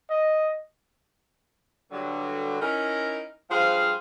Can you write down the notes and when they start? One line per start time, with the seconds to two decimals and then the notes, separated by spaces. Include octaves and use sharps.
0.10 D#5
1.92 G2 D3 F#3
2.61 C#4 D#4 E4 A#4
3.51 G2 F3 G#4 C5 F5